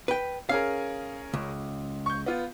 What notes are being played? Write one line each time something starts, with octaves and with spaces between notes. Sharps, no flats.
B4 G5
C#4 G#4 A#4 F5
C#2
C#6 G6
B3 F4